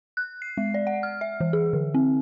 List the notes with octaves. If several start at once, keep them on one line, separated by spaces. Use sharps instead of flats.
F#6
C7
G#3
D5
F#5
F6
E5
E3
G#4
D3
C4